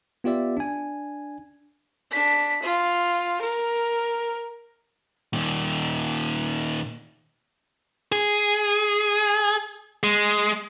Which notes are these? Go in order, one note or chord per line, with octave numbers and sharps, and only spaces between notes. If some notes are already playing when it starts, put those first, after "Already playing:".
B3 F4 G4 D5 E5
D4 G#5
D4 B6
F4
A#4
A#2 D#3
G#4
G#3